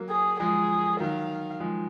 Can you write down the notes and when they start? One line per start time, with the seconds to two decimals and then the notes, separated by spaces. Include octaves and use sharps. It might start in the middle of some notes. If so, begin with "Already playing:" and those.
Already playing: F#3 A#3
0.10 G#4
0.40 F3 G#3 G#4
1.00 D#3 F#3 F5
1.60 F3 G#3